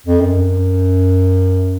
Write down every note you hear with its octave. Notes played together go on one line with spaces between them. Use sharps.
F2
F#2